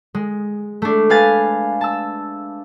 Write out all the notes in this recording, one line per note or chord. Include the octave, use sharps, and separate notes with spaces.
G#3
A3 D4
B4 F5 G#5 A6
A5 E6